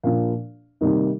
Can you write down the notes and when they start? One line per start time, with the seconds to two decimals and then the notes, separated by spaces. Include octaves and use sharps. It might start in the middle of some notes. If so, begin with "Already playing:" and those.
0.03 A#2 F3 A#3 D4 F5
0.81 C3 D#3 G3 A#3 D#4